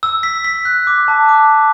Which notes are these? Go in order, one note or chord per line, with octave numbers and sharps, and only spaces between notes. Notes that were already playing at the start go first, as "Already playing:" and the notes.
E6
B6
B6
F#6
D6
A5
D6